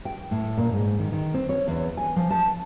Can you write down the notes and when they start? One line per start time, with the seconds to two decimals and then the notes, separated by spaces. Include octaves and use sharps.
0.05 G5
0.31 A2
0.58 A#2
0.73 G#2
0.99 D#3
1.12 D#3
1.34 C4
1.49 C#5
1.68 E2
1.97 G#5
2.16 F3
2.30 A5